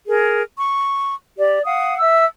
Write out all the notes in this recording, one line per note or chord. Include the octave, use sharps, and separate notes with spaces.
G#4 A#4
C#6
G4 D5
F5 F#5 D#6
E5 E6